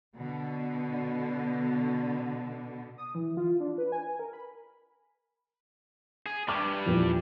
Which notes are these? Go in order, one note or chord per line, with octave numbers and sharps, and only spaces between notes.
B2 D3
D#6
E3
F4
D4
B4
G#5
A#4
B5
G#4
G2 G3 D6
A#1 E2 A#2